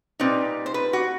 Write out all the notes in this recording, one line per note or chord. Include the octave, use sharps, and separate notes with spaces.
A#2 G3 C4 D#4 B4
C5
B4
F#4